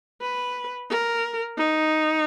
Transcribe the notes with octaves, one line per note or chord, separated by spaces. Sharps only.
B4
A#4
D#4